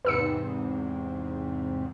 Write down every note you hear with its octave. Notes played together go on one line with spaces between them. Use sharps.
E2 G#2 C3 B4 E6 C#7